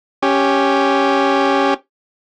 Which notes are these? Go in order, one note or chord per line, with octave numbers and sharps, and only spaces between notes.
C#4 G4